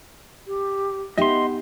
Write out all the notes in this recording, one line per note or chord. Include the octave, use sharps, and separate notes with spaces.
G4
B3 D#4 G4 D#5 E5 C6